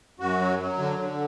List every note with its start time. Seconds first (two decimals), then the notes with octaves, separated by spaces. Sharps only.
0.20 F#2 F#4
0.40 F#3
0.59 F#3
0.78 D3
0.97 D3